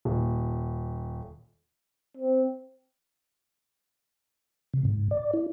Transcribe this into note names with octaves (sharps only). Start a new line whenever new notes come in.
D#1
C4
C3
G#2
D5
E4